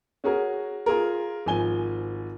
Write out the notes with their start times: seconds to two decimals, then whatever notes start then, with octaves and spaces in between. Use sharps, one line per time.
0.24 C#4 F#4 G#4 A#4
0.86 F4 G#4 A#4
1.46 G#1 F3 G#5 G7